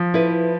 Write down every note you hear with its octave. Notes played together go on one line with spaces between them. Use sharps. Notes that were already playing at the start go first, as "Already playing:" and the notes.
Already playing: F3
E4 B4